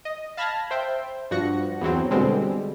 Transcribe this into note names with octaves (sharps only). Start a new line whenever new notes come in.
D#5
F5 A5 B5 F6 G#6 A#6
C5 E5 G5
G2 F3 F#4 A#6 C#7
E2 E3 F#3 C4
B2 D3 G3 G#3 C4